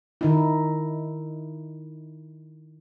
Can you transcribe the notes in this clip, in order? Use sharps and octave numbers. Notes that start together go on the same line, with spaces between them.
D#3 D#4 E4